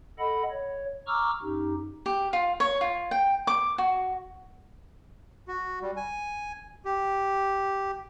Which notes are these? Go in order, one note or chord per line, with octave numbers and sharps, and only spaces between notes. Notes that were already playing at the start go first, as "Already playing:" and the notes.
A4 D#5 F#5 B5
C#5
A#5 C#6 D6 E6 F6
F#2 D#4 G4
G4
F4
C#5
F4
G5
D6
F#4
F#4
G3
G#5
G4